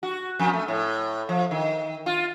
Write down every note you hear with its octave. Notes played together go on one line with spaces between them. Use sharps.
F#4
F2
A3
A2
F3
D#3
F4